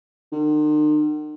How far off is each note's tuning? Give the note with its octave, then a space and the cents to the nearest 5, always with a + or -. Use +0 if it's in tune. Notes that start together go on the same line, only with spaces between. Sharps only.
D#3 -45